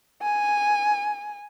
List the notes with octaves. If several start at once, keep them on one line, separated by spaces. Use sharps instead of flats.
G#5